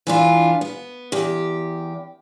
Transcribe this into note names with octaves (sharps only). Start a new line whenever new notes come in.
E3 D4 F4
B3
E2 G4